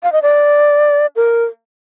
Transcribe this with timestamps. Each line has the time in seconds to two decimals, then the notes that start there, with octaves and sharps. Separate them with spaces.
0.03 F5
0.12 D#5
0.22 D5
1.16 A#4